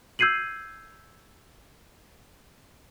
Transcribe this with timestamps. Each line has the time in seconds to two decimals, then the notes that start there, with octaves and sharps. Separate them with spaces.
0.19 E6 G6 G#6 C7 D#7 F#7